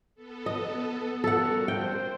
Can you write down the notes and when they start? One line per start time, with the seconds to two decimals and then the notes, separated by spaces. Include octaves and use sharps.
0.15 B3 A4
0.46 D#5
1.24 G3 F#4 A4 A#4 F#5
1.68 C5 G5